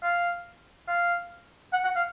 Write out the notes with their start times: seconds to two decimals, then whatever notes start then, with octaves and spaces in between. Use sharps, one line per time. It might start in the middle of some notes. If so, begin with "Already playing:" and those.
0.03 F5
0.88 F5
1.73 F#5
1.84 F#5
1.96 F5